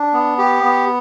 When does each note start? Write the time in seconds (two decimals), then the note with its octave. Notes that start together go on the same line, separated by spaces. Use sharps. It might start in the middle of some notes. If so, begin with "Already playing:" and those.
Already playing: D4
0.13 B3
0.38 G4
0.63 B3